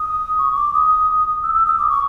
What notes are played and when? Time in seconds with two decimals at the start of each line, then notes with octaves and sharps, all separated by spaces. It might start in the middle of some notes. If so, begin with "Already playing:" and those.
Already playing: D#6
0.38 C#6
0.56 D6
0.74 D#6
1.43 E6
1.55 E6
1.66 D#6
1.78 D6
1.89 C#6